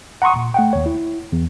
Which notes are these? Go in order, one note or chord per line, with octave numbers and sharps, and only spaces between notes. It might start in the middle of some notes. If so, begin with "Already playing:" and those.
F#5 A#5 C6 C#6 D#6
A#2
A3 F#5 G5
D#2 C#5
E4
E2